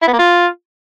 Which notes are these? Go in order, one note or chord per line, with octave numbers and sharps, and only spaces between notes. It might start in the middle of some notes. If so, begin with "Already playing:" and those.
E4
B3
A#3
F4